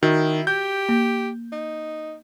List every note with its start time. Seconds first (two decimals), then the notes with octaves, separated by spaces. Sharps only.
0.03 D#3 E4 F#4
0.47 G4 G6
0.89 A#3
1.52 D#4